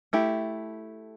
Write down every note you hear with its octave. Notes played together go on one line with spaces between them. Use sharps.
A3 E4 G4